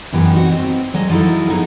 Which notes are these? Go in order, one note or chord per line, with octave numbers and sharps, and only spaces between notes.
F#2 E3 B3 G4
C4 D#4 F#4
C4
F#3 G#3 D#5
F3 F#3 D#4 E4 A4
B3 D#4 G#4